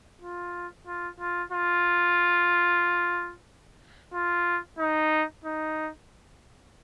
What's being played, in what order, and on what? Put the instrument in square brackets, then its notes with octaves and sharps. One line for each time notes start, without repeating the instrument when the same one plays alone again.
[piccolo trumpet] F4
F4
F4
F4
F4
D#4
D#4